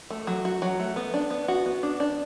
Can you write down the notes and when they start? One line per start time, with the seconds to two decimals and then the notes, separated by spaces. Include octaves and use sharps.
0.10 A3
0.27 F#3
0.45 F#4
0.62 F#3
0.79 A3
0.96 B3
1.14 D4
1.30 B3
1.48 F#4
1.66 B3
1.83 D4
2.00 D4